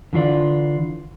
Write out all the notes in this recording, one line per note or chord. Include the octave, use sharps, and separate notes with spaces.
D3 E3 F4 D5